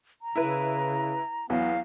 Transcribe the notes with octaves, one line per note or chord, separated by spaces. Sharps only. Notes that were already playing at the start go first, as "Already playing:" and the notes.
A#5
C#3 E4 B4
E2 E3 F#3 B3 F5